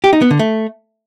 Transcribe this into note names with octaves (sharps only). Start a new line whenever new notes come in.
G4
D#4
B3
D3
A3